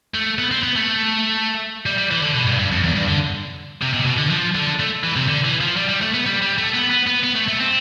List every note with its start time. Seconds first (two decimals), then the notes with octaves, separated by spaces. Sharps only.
0.15 A3
0.39 B3
0.51 C4
0.63 B3
0.76 A3
1.86 G3
1.98 G3
2.11 E3
2.22 D3
2.35 B2
2.47 G2
2.59 G2
2.71 F2
2.84 E2
2.95 G2
3.08 D3
3.82 C3
3.94 B2
4.01 C3
4.06 B2
4.18 D3
4.30 F3
4.55 D3
4.79 A3
5.04 E3
5.16 C3
5.28 D3
5.45 E3
5.61 F3
5.77 G3
5.89 G3
6.01 A3
6.14 B3
6.26 G3
6.42 G3
6.58 A3
6.74 B3
6.90 B3
7.07 B3
7.24 B3
7.36 A3
7.48 A3
7.61 C4